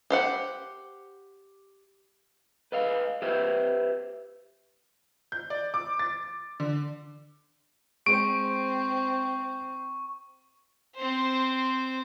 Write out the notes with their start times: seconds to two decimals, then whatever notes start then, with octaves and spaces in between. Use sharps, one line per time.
0.10 G4 C5 F#5
2.72 B4 D#5 F5
3.22 G4 B4 C5 E5
5.32 G6
5.50 D5
5.74 D6
5.99 A6
6.60 D3
8.06 G#3 C4 C5 C#6 D7
10.96 C4 C5